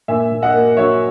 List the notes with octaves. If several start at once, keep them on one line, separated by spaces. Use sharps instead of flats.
A#2 E5 G#5
A#2
D#5 F#5
A#3
F#3 C#5 E5